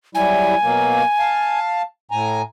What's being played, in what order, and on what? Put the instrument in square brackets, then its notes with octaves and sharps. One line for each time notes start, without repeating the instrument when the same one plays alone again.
[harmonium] F#3 G3 E4 [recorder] G#5
[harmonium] B2 F#3 A#3
F5 A5
A2 G#5 A#5